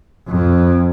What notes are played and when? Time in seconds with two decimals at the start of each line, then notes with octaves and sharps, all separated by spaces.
0.28 F2